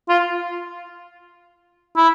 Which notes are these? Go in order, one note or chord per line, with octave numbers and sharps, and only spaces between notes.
F4
E4